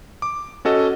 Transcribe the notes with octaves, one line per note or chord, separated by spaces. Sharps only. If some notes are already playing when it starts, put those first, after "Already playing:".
D6
C#4 F#4 A4 D#5